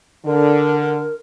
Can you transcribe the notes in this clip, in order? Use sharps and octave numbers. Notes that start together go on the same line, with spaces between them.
D3 A#4